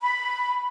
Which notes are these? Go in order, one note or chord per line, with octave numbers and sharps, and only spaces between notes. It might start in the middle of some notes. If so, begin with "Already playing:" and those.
B5